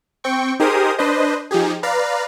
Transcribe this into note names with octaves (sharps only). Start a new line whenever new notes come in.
C4 G5 C#6
D#4 G4 G#4 A#4 C5 D#6
D4 B4 C5 D#5
F3 D#4 G4 G#4
B4 D5 F5 A#5